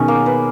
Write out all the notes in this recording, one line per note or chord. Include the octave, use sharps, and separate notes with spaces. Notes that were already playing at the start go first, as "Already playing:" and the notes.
Already playing: B2 D#3 C#4 G#4 A#4
A#3
B4